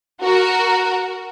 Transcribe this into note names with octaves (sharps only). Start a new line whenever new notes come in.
F#4 A#4